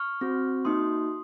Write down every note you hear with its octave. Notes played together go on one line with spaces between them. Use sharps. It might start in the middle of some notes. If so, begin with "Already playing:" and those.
Already playing: C#6 F6
C4 F#4
A#3 D#4 F#4 C6 D#6